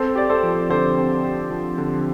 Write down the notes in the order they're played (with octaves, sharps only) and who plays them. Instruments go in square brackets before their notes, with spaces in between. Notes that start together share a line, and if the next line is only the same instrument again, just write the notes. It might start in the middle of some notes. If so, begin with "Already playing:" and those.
Already playing: [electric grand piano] C4 [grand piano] A4 C5
[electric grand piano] G4 [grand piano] D5
[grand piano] A4 C5
[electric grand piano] F3
[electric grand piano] D3 [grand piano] A4 C5
[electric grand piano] C4
G4
F3
D3